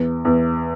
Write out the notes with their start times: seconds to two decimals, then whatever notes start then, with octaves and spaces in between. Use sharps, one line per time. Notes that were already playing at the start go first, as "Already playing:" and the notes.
Already playing: E2
0.25 E2